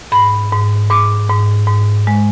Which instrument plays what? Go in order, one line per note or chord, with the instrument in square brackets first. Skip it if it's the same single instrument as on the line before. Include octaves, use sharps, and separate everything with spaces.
[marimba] G#2 B5
G#2
G#2 D6
G#2
G#2
G#3